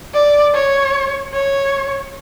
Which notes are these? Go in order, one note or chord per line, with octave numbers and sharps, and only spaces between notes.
D5
C#5
C#5